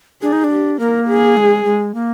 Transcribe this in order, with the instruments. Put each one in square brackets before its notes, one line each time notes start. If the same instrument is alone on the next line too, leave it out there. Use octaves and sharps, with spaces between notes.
[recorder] D4 [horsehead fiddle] G#4
[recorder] D#4
D4
[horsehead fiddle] G4
[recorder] A#3 [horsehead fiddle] A#4
[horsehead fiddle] G#4
[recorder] G#3
G#3
A#3